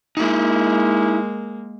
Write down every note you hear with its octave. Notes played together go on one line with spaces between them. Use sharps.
G#3 A#3 D#4 E4